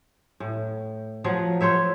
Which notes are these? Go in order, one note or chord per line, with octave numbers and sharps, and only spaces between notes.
A2
F3 F#3 F5
F4 C5 C#5 E5